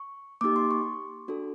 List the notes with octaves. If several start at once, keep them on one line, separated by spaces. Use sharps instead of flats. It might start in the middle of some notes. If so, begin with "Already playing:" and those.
Already playing: C#6
A#3 D#4 G4 D6
C6
C#6
D4 F#4 A4